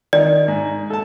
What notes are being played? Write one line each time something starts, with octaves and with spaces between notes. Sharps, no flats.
D#3 D5
G#2
A4 A5